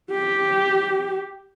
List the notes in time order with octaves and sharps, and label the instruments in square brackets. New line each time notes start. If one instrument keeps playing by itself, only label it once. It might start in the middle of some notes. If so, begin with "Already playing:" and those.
[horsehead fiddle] G4